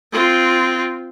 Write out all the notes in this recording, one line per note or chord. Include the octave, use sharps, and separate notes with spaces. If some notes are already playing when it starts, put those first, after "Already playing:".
C4 F4